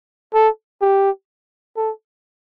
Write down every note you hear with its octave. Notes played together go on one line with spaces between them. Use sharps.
A4
G4
A4